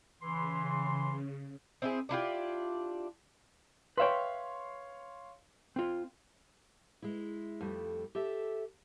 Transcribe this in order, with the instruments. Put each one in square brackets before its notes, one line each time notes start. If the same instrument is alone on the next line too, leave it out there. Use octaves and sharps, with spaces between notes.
[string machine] C#3 [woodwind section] E3 C6
[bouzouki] C4 E4 G#4
D4 E4 F4 G4
[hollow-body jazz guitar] B4 E5 G5 [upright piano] C#5 F5 C6
[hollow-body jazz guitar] C4 F4
[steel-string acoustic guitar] G#3 E4
F2 G3 A3
G4 A4 E5